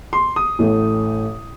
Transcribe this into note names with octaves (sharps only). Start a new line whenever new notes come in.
C6
D#6
A1 A2 A3